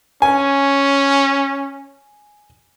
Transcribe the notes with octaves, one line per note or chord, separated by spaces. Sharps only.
C#4 G#5